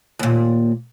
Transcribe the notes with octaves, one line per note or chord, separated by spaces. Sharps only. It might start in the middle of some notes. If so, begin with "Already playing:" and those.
D#2 A#2